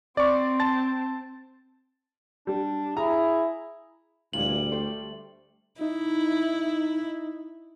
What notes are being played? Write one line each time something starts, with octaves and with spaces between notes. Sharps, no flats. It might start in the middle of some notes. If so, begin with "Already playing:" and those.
C4 D5 C#6
A5 A6
G3 D4
E4 G#4 A#5
D2 A#2 E3 G3 G#3 F#7
A3 G4 C5
D#4 E4